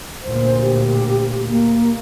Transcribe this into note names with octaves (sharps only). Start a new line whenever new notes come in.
D2 A#2 C5
G4
A#3